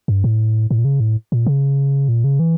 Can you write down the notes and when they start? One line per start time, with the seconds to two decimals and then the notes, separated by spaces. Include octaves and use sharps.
0.08 G2
0.24 A2
0.71 A2
0.78 A#2
0.85 C#3
1.00 A2
1.32 A#2
1.46 C#3
2.09 A#2
2.24 C#3
2.39 E3